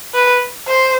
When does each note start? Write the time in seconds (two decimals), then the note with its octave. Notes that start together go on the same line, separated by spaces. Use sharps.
0.15 B4
0.67 C5